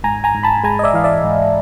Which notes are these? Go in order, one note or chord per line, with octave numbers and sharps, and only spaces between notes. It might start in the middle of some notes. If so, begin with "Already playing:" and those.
G#2 G#5 A#5
G#5 A#5
G#2
A5 B5
G#3 G#5 A#5
D#5
D5 E5
E3 F5
D5 E5
G#2